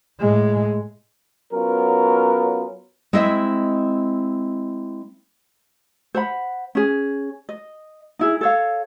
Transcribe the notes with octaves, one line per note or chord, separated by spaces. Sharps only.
A2 G#3
F#3 B3 C#4 F4 A#4
G#3 C4 E4 D#5 E5
C5 F#5 B5
C#4 G#4
D#5
D#4 E4 G#4
A4 C#5 F5